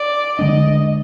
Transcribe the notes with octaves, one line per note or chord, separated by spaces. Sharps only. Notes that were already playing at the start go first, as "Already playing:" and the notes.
Already playing: D5
D3 G#3 D4 D#5